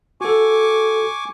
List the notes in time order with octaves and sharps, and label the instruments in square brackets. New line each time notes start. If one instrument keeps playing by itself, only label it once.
[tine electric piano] F#4 A4 [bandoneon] G#5 C#6 D6